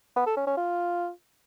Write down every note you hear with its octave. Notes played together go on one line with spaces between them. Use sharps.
B3
A4
C#4
C#4
F4